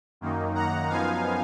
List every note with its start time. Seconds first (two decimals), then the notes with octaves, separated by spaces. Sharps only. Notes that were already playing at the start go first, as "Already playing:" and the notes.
0.21 F#2 D#3 A#3 D#4
0.55 F#5 A#5
0.90 F#2 F3 B3 D#4 F5 G#5